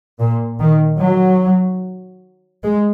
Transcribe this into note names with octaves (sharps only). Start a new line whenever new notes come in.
A#2
D#3
F#3
G#3